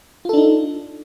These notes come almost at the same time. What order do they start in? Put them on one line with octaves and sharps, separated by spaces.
F4 A4 D4 D#4